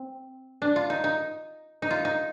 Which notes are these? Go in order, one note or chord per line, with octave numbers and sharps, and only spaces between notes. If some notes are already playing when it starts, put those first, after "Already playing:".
Already playing: C4
D4
F4
D#4
D#4
D#4
F4
D#4